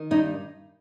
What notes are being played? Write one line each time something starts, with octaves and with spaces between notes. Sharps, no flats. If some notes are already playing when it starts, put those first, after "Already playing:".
Already playing: D#3
G2 D#4